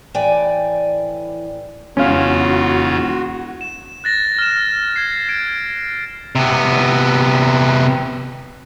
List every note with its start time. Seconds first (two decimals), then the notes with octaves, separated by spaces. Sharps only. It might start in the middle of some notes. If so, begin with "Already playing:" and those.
0.14 A2 E3 D5 G5 G#5
1.97 E1 F2 C#3 C#4 F4 F#4 F5
3.61 E7
4.04 F#6 A6 A#6
4.38 F6 E7
4.96 G#6 C7
5.28 G#6 D7
6.35 C3 B3